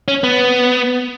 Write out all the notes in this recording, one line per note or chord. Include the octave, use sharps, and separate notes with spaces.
C#4
B3